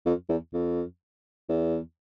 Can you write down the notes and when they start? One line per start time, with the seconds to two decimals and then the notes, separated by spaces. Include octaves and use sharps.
0.06 F2
0.29 E2
0.54 F2
1.49 E2